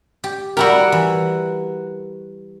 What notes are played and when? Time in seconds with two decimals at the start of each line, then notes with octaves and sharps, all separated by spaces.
0.24 G4
0.57 G3 E4 F#4 G4 A#4
0.92 E3